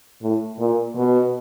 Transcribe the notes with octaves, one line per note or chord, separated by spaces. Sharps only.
A2
A#2
B2